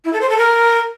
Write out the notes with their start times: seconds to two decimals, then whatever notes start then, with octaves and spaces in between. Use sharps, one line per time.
0.05 E4
0.13 A4
0.21 C5
0.30 A4
0.38 A#4